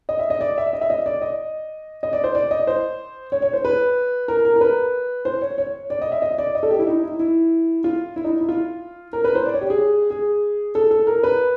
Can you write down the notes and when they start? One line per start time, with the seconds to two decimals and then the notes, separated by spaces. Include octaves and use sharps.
0.09 D#5
0.19 E5
0.30 D#5
0.41 D5
0.58 E5
0.73 D#5
0.81 E5
0.90 D#5
1.06 D5
1.22 D#5
2.03 D#5
2.13 D5
2.24 C5
2.35 D5
2.51 D#5
2.67 C5
3.32 C#5
3.42 C#5
3.53 C5
3.65 B4
4.28 A#4
4.45 A#4
4.56 A#4
4.61 B4
5.25 C5
5.42 C#5
5.58 C#5
5.90 D5
6.02 D#5
6.12 E5
6.22 D#5
6.38 D5
6.55 D#5
6.63 A4
6.70 G4
6.79 E4
6.87 D#4
7.03 E4
7.19 E4
7.84 F4
8.16 E4
8.24 D#4
8.41 E4
8.49 F4
9.13 A#4
9.24 B4
9.35 C5
9.46 D5
9.54 C#5
9.61 G4
9.70 G#4
10.10 G#4
10.75 A4
10.91 A4
11.07 A#4
11.23 B4